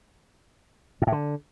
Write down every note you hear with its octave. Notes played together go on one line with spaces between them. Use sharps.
G#2
A2
D3